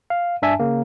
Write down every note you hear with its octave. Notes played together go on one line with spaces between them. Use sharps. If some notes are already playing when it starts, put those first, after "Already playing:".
F5
G2 D4 E5 G#5 A5
C#3 A#3